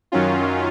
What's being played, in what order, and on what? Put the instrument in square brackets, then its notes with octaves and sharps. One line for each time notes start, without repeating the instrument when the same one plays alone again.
[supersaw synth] F#2 D#3 F#3 C#4 F4